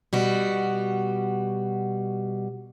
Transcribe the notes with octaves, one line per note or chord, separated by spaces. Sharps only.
B2 G3 F#4